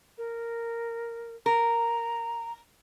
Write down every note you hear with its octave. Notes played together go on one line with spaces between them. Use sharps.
A#4
A#4 A#5